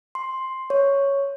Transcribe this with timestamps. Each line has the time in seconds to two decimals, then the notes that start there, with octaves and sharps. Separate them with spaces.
0.15 C6
0.70 C#5